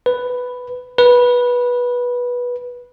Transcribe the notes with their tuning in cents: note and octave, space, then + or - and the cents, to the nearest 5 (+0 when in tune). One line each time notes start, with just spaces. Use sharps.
B4 +5
B4 -15